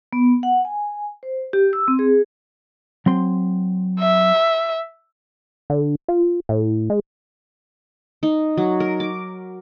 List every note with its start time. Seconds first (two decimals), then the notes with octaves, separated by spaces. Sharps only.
0.13 B3
0.43 F#5
0.65 G#5
1.23 C5
1.53 G4
1.73 E6
1.88 C4
1.99 G#4
3.06 F#3 C4 C6
4.00 E5
5.70 D3
6.08 F4
6.49 A2
6.90 G#3
8.23 D#4
8.57 F#3
8.80 A#4
9.00 D6